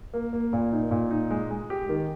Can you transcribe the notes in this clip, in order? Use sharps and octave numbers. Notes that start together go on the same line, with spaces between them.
A#3
A#3
A#2
D#4
A#2
D#4
G#3
G#3
G4
D#3